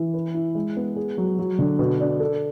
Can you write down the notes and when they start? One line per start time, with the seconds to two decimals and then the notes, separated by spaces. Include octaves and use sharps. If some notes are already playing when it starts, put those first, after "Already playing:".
Already playing: E3
0.14 B4
0.34 E4
0.55 G#3
0.77 B3
0.96 G#4
1.18 F#3
1.39 F#3
1.59 D3
1.79 B2
2.00 D4
2.20 A4